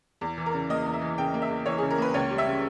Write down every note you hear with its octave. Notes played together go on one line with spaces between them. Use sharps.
E2
E3
A#4
C#3
A#3 D#5
E2
E5
E3
C#3 G5
A#3
E5
E2
E3 C#5
C#3 G#4
A#4
A#3 B4
C#2 C#5
G3
E5
C#3